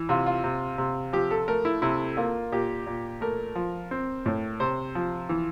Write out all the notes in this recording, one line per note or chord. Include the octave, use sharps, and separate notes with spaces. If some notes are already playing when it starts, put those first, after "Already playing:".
Already playing: E3
C3 F4
F4
C3
C3
F3 G4
A4
A3 A#4
E4
C3 E4
A#3 F4
A#2 G4
A#2
A3 A#4
F3
C4
A2
C3 C5
F3
E3